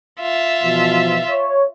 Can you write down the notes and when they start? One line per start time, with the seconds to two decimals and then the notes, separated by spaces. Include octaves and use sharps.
0.21 F4 E5
0.63 B2 E3 F3
1.31 C#5